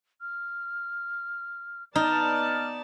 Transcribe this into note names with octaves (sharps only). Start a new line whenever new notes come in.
F6
B3 D#4 D5 A5 F6